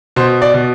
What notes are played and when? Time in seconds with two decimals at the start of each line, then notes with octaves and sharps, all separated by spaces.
0.16 B2 C5
0.42 D5
0.54 B2